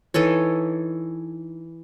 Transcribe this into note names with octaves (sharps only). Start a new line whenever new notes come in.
E3 D#4 A4 C#5